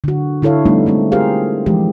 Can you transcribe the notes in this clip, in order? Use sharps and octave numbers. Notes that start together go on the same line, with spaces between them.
D3 F#4
D3 E4 A4 C#5 F5
G3 A3 B3 D4 D#4
G#3 A3 C4
F4 G4 G#4 A#4 C5 F5
E3 F3 G#3 G4